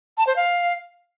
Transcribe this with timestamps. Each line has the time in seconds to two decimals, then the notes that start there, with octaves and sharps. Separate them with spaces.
0.18 A5
0.27 C5
0.36 F5